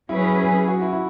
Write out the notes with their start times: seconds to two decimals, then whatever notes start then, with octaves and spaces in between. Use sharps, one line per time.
0.08 F#3 C#4 E4 G#4 B4
0.67 F#4
0.82 E4
0.93 E4